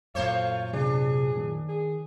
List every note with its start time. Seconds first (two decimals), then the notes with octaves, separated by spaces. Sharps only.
0.15 F#2 A#2 A3 C5 C#5 F5
0.73 C3 D4 G#4
1.37 D#3
1.68 G#4